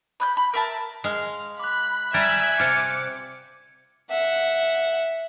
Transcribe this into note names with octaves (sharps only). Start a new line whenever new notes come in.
B5 F#6 G6
B5
A#4 E5 A5
G#3 F5
B5 D6 F#6
G3 D5 E5 G#5 A#5 E6 F#6 G6
C3 F4 D6 C#7
E5 F#5